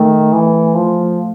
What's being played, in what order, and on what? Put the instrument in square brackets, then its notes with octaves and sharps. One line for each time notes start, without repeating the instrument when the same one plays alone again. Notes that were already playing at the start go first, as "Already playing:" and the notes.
Already playing: [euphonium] D#3 [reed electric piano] A3
[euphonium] E3
F3